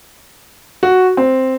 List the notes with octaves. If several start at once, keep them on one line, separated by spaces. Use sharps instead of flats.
F#4
C4